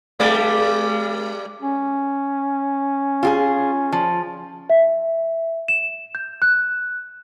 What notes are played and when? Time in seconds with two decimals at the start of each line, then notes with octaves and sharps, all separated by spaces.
0.20 G3 G#3 D5
1.62 C#4
3.23 F4 G4 G#4
3.92 F3
4.70 E5
5.68 E7
6.15 G6
6.42 F#6